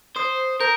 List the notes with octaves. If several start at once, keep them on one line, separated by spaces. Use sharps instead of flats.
C5 D#6
A#4 G6